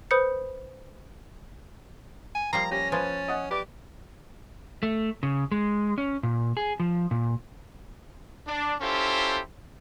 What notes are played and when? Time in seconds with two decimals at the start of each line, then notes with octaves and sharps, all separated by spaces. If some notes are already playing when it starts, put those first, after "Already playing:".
0.11 B4 C5 B5 D#6 G6 C#7
2.35 G#5
2.53 F3 G3 A#3 A#5 C7
2.71 C#4 G4 A#6
2.92 F3 B4 C5 G#5 A6
3.28 D#5 F#5
3.51 G4 B4 D5 D6
4.83 A3
5.23 C#3
5.52 G#3
5.98 C#4
6.23 A#2
6.57 G#4
6.80 F3
7.11 A#2
8.48 D4
8.81 C#4 E4 F4 G4 A4 C5